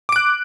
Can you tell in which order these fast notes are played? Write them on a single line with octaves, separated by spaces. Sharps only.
D6 D7 F#6